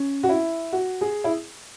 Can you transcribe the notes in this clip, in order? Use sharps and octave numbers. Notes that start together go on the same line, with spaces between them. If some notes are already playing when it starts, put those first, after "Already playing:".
Already playing: C#4
F#4
E4
F#4
G#4
E4